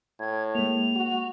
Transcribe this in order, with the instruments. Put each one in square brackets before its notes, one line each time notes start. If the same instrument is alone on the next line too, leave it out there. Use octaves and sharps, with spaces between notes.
[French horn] A2 [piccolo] G#6
[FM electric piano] G#3 A#3 [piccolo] F7
[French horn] F#4